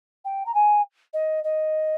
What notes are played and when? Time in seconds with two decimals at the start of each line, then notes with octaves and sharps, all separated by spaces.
0.25 G5
0.46 A#5
0.54 G#5
1.13 D#5
1.44 D#5